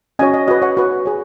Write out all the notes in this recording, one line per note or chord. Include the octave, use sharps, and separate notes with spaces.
C#4 F#4 C#5 D#5 G#5
D#5
F#4 B4 D#5
C#5 F#5
F#4 B4
G#4 C#5